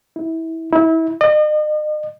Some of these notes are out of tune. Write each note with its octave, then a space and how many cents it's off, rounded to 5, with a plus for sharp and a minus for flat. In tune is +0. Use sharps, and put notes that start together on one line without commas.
E4 -25
E4 -30
D#5 -40